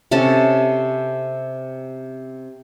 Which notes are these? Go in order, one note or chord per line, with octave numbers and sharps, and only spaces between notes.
C3 C#4 A4 A5